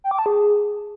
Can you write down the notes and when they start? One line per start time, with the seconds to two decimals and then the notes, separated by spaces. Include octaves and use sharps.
0.04 G5
0.11 D6
0.19 A5
0.26 G#4